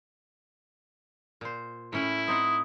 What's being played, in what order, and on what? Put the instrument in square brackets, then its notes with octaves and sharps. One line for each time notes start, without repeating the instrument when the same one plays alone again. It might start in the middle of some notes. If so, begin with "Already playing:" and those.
[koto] A#2 C5
[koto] A2 C#4 G5 [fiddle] E4
[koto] C4 D#4 F#5 [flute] D#6